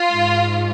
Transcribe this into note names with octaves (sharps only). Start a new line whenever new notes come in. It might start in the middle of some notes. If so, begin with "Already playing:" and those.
Already playing: F4
G#2